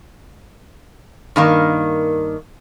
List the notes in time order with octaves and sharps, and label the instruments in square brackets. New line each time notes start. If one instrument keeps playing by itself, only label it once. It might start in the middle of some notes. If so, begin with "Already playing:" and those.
[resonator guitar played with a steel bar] G2 D#3 A#3